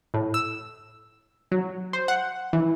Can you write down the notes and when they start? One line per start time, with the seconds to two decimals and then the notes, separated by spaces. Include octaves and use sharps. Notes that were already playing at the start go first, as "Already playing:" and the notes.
0.14 A2
0.34 E6
1.52 F#3
1.93 C5
2.08 F#5
2.53 E3